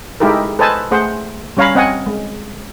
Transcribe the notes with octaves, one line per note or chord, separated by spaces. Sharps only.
G#3 D#4 E4 G4 A4 A#4
A4 B4 C5 D#5 G#5 A5
A3 G#4 C5 F#5
G3 C#4 C#5 F5 A#5 B5
C4 D#5 F#5 G#5
G#3